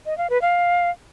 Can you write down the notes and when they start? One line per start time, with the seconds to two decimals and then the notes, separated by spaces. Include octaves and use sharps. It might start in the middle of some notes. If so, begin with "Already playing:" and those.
0.06 D#5
0.18 F5
0.30 B4
0.42 F5